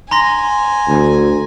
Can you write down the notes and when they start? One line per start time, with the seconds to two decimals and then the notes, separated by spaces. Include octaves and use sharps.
0.11 G#5 A#5 C6 A#6
0.88 D2